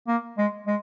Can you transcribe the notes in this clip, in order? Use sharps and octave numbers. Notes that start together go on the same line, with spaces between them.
A#3
G#3
G#3